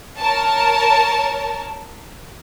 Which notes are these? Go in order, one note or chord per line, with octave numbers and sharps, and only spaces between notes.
A#4 C#5 A5